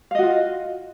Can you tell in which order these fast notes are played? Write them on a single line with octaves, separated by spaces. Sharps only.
F5 D#5 F#4 F4